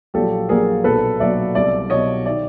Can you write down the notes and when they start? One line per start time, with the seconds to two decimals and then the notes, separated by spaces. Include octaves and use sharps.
0.14 A#1 A#2 F#3 G4 A4
0.49 A#1 A#2 F#3 G#4 A#4
0.84 B1 A#2 F#3 A4 B4
1.20 B1 A#2 F#3 D5 E5
1.55 C2 B2 F#3 D5 E5
1.90 C2 B2 F#3 C#5 D#5
2.26 D#3 D5 E5